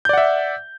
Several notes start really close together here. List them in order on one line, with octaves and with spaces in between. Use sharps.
G6 D5 F#5 E5